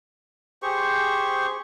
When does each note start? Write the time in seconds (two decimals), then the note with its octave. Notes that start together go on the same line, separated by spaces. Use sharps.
0.63 G4 G#4 C5 C#6